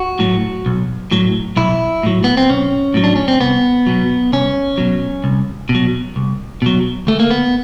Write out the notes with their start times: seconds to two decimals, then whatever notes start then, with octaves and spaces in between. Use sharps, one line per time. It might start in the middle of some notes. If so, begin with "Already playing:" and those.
Already playing: F#4
0.19 A2 F#3
0.66 B1
1.11 A2 F#3
1.57 B1 E4
2.03 A2 F#3
2.24 B3
2.37 C4
2.49 B1 C#4
2.94 A2 F#3
3.04 D4
3.16 C#4
3.28 C4
3.40 C2 B3
3.86 B2 F#3
4.32 C2 C#4
4.78 B2 F#3
5.24 C2
5.69 B2
5.75 F#3
6.16 C2
6.62 B2 F#3
7.07 D2 A3
7.20 A#3
7.31 B3